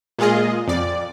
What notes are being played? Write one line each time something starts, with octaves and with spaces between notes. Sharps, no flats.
A#2 G#3 F4 G#4 D#5
F2 D5